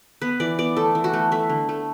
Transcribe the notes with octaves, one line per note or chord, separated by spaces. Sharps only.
B3 B4
E3 D5
B3 D5
A3 A4
E3
F#4
A3
A3 E5
D3
A3